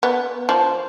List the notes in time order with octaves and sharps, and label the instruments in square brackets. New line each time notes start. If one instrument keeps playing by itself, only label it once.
[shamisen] B3
F3